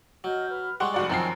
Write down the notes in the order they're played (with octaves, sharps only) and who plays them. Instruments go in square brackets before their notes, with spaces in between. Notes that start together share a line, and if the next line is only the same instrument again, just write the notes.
[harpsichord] F#3 [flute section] D#5 F6 G6
[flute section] B4 F6
[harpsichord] G3 G#3 [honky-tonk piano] F#5 C6 [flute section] C#6
[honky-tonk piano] F1 F#4 D5
[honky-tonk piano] F#2 F3 C7 [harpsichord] D#3 C4 [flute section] F#4 G#5 A5